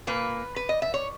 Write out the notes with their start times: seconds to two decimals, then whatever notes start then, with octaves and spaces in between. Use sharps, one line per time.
0.07 A#2 A#3 B4
0.56 B4
0.69 D#5
0.82 E5
0.94 C#5